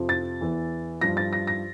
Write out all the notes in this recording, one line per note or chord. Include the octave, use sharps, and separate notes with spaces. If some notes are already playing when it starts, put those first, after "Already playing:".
Already playing: F2 C3 F3
A6
E2 E3
G2 F3 A#6
A6
A#6
A#6